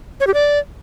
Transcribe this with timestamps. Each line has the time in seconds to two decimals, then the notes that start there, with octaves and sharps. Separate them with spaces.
0.20 C#5
0.27 G4
0.34 D5